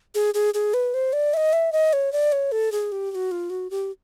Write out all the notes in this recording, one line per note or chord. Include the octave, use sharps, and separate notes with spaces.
G#4
G#4
G#4
B4
C5
D5
E5
D#5
E5
D#5
C#5
D5
C#5
A4
G#4
G4
G4
F#4
F4
F#4
G4